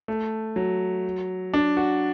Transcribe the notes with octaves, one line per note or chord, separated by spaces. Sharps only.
A3
F#3
D4
F#4